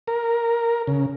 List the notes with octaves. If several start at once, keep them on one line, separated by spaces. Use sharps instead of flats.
A#4
C#3